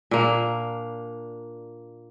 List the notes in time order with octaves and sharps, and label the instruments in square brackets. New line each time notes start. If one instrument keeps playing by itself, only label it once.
[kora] A#2 A#3 D4